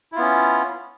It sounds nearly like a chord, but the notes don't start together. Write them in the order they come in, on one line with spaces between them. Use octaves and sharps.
E4 F4 B3 C#4